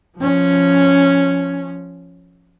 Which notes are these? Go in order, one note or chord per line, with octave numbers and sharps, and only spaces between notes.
F3 C#4